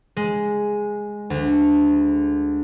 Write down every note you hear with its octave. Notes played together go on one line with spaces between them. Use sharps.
G#3
D2